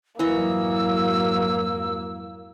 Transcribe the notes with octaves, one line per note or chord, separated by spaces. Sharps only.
F2 G#2 E3 F#3 A#3 D#5 C#6 E6